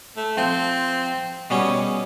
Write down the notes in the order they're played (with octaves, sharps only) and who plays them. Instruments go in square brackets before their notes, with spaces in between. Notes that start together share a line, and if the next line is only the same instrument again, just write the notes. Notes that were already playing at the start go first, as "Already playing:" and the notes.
[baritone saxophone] A3
[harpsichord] F3 [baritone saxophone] C4
[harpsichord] B2 G3 C#4 [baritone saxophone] G#4